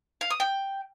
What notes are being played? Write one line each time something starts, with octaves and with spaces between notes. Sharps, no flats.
F5
D#6
G5